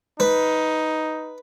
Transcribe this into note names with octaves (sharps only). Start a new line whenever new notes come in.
D#4 B4